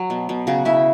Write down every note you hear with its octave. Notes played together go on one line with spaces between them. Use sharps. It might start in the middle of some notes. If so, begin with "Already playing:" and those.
Already playing: F#3
B2
B2
C#3 F#4 F#5
C#3 E4 E5